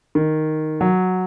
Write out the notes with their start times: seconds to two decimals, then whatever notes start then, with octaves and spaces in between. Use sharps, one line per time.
0.15 D#3
0.81 F#3